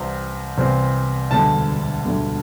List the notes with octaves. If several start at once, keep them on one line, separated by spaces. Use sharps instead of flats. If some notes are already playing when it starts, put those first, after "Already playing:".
Already playing: C2 C3 E3 C4
C2 C3 E3 C4
E1 D2 D3 G3 A5
E1 D2 D3 G3